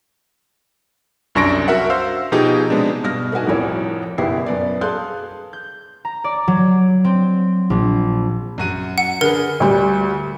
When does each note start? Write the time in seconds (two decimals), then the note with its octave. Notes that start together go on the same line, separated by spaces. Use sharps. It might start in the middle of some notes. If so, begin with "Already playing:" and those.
1.35 C2 F#2 D4 C#6 A#6 D7
1.68 F#4 A#4 E5 F#5
1.90 C5 F5 E6
2.32 B2 F3 D#4 G4 G#4
2.70 C3 G#3 B3 D4
3.03 G2 B2 F6 A#6
3.32 A3 B3 D#4 F#4 G#5
3.47 C2 F2 A2 A#4 C#5
4.18 F#1 B2 E4 G4 B4 C7
4.46 F#2 B3 D5
4.81 G#4 A4 F5 C6 F#6 G6
5.53 G6
6.05 A#5
6.24 D5
6.48 F#3
7.05 C4
7.70 A#1
8.58 F#2 F#4 D#7
8.98 F#5
9.21 D3 G#4 A#4 B4
9.60 D2 G3